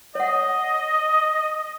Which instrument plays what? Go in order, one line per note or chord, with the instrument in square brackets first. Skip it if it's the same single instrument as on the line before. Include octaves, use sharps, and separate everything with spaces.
[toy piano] C#5 F#5 [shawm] D#5